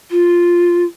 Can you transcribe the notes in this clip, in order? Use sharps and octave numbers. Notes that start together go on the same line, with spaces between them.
F4